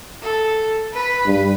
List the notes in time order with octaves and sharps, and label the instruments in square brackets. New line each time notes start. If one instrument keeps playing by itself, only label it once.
[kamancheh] A4
B4 B5
[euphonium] G2